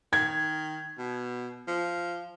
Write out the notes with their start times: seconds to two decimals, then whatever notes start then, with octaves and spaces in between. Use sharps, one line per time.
0.13 D#3 G#6
0.98 B2
1.68 F3